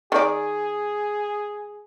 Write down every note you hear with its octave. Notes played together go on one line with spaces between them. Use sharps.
D#3 G#4 D5